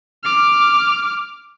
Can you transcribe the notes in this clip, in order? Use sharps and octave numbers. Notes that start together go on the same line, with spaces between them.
D6 F6